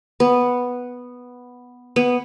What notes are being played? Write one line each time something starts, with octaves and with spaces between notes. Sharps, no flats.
B3
B3